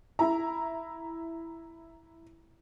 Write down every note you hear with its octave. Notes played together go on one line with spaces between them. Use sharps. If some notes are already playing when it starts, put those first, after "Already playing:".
E4 A#5